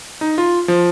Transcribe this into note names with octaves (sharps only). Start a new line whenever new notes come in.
D#4
F4
F3